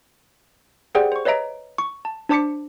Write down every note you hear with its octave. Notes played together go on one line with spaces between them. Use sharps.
G4 G#4 C5 D5 F#5 G5
C5 C#6
B4 C#5 D#5 E5 A#5 D7
C#6
A5
D4 C5 A5 D6 B6 C#7